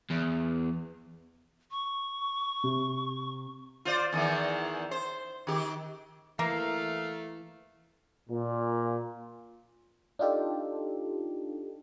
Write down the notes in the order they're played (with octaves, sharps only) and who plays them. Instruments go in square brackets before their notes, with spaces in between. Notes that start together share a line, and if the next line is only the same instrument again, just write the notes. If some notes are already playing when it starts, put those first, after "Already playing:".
[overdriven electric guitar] E2
[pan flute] C#6
[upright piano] C3
[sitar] F4 C5 D5
E2 D#3 E3
C5
D#3 G4
[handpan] E3 [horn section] A3 [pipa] A#3 [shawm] F5
[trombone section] A#2
[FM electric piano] D4 D#4 F4 G4 A4